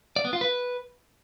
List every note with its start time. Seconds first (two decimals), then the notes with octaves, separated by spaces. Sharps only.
0.16 D5
0.25 B3
0.33 F4
0.41 B4